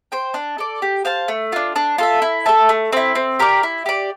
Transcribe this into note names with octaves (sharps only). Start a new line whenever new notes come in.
C5 G5
D4
A4 D5
G4
C5 F5 A5
A3
D4 F4
D4
F4 A4 E5
E4
A4 E5 A5
A3
C4 E4
C4
G4 A#4 D5
E4
G4 D5